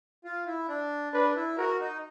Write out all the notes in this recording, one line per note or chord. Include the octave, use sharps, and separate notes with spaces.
F4
E4
D4
D4 B4
E4
F#4 A#4
D#4